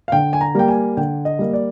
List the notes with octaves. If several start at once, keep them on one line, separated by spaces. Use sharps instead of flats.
F5
D3 G5
G#5
A#5
G3 A#3 G5
G#5
D3 G5
D#5
G3 A#3
D5